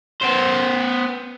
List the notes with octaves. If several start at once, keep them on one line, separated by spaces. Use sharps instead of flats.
B3 C5